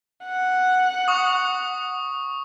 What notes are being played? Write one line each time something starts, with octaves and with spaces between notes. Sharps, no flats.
F#5
C#6 D#6